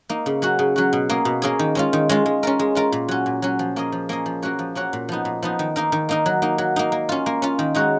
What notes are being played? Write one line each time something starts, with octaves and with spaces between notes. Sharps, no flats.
A#3 D#4
C#3
F#3 C#4 F#4
C#3
F#3 C#4 F#4
B2
A#3 C#4 G#4
B2
A#3 C#4 G#4
D#3
G#3 C#4 F4
D#3
G#3 C#4 F4
G#3
C#4 F4 A#4
G#3
C#4 F4 A#4
A#2
F#3 C#4
A#2
F#3 C#4
F3
A#3 C#4 G#4 D#5
F3
A#3 C#4 G#4 D#5
F3
A#3 C#4 F#4 C#5
F3
A#3 C#4 F#4 C#5
A#2
F3 B3 D#4
A#2
F3 B3 D#4
D#3
A#3 D#4 A#4
D#3
A#3 D#4 A#4
F#3
A#3 D#4
F#3
A#3 D#4
A#3
C#4 F4
A#3
C#4 F4
D#3
G#3 D#4 F#4 C#5